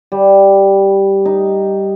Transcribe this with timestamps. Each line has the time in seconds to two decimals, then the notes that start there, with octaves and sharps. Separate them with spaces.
0.12 G3
1.25 D#4